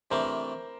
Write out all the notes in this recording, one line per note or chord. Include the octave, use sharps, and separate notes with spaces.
C3 E3 A3 D4 A#4 C5